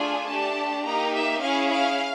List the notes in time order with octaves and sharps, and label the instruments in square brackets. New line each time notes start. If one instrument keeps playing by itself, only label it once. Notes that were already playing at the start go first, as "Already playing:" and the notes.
Already playing: [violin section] A3 D4 F4 G#4 G#5
A3 D4 G4 A5
A#3 D#4 G4 A#5
E5
C#4 E4 G#4 F5
F5